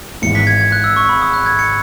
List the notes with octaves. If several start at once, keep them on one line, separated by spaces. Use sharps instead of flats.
G#1 G#2 E3 G#3 C#7
B6
G#6
G#6
F#6
E6
C#6
B5
D#6
F#6
G#6
C#7